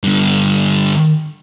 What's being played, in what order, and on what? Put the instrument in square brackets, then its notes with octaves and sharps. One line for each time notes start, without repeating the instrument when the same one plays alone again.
[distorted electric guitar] G2 D3